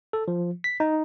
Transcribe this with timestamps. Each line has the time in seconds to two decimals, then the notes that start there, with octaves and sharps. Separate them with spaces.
0.13 A4
0.28 F3
0.64 B6
0.80 D#4